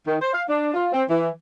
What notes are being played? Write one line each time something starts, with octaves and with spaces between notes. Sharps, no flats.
D#3
C5
F5
D4
F4
C4
E3